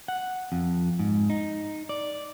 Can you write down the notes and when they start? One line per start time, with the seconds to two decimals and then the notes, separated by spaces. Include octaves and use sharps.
0.08 F#5
0.52 F2
0.99 G#2
1.30 D#4
1.89 D5